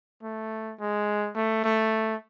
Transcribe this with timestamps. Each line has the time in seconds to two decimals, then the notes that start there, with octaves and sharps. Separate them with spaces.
0.23 A3
0.80 G#3
1.36 A3
1.64 A3